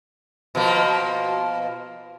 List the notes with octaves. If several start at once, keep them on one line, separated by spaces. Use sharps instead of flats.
B2 F3 A#3